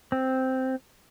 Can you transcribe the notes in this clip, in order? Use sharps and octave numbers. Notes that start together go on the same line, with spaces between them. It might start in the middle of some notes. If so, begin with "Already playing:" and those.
C4